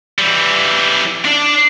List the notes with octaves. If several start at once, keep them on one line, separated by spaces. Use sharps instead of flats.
E3 G3
D4 D5